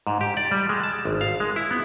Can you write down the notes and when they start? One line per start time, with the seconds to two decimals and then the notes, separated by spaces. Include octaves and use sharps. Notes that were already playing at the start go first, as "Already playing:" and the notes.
0.07 G#2
0.21 G4
0.37 D5
0.51 G3
0.69 G#3
0.83 A5
1.05 G#1
1.21 F5
1.40 G#3
1.56 E4
1.71 B3